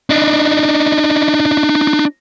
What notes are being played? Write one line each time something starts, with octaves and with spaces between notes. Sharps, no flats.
D4 D#4